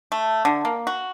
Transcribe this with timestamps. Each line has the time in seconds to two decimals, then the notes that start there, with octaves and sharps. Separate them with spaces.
0.12 A3
0.45 D3
0.65 A#3
0.87 F#4